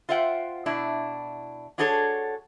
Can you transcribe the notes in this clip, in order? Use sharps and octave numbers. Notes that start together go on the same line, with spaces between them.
F4 C5 E5 F#5 G5
B2 D4 E4
D4 F#4 G#4 A4 C5 C#5